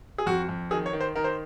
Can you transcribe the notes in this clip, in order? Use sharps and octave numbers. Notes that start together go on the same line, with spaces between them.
G#4
F2 F#4
F2
D#3 G#4
C#5
D#3
C5
D#3 A#4
C5